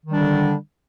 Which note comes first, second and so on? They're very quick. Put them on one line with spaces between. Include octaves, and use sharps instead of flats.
D#3 G3 D4 D3